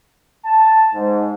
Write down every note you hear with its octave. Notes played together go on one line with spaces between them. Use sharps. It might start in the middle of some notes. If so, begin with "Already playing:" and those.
A5
G#2